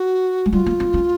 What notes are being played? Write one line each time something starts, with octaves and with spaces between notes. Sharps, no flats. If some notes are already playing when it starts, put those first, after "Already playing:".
Already playing: F#4
G#3
G3 F4
A#3
C4
C#4